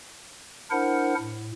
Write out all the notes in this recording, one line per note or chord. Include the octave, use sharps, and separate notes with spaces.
D4 E4 A#4 C5 F#5
A2